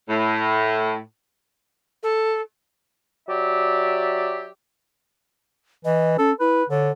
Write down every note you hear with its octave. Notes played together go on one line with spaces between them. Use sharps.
A2
A4
F#3 G4 D5 E5
E3 D#5
C#4 A4
E4 B4
D3 C#5